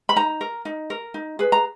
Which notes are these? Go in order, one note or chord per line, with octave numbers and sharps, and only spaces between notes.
B5
D#4 A#5
A#4
D#4
A#4
D#4
G#4 B4
A#5